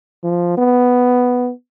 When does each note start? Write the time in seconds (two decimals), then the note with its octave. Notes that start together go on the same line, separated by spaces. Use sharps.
0.23 F3
0.58 B3